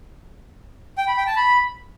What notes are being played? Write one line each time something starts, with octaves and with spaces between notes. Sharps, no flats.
G5
B5
G5
A5
B5